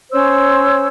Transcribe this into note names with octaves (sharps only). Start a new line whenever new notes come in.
C#4 C5 C#5 E6